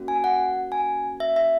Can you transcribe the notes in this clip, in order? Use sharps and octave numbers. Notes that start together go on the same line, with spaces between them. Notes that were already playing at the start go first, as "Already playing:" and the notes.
Already playing: A#3 C#4 F#4
G#5
F#5
G#5
E5
E5